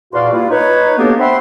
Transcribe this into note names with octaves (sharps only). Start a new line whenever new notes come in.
E2 A#2 F#4 D5 F5 C6
G3 A#3 E4 F4
D#4 B4 C#5
F#3 A#3 B3 D4 G4 A4
C5 E5 F#5 G5 B5 C6